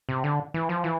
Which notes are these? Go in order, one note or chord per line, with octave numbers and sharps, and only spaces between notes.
C3
D3
E3
F3
E3